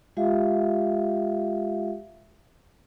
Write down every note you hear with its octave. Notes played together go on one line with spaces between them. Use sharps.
G#3 F4 G4 E5 F5